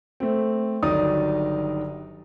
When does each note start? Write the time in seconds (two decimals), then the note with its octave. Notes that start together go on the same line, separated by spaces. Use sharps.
0.20 A3 C4
0.83 G1 D#3 F#3 D#4 D5 D#6